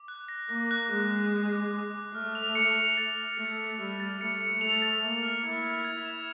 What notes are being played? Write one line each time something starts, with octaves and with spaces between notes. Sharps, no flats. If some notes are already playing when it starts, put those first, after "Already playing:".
Already playing: D6
F#6
A#6
A#3 A#6
F#6
G#3 F#6
A#6
A#6
D6
D6
D6
A3 F6
F7
C#7
F7
A6
F7
A3 C#7
C#7
G3 F6
A6
A3 C#7
C#7
A3 F7
A6
A#3 F7
F6
E4 G#6
G#6
G#6
E7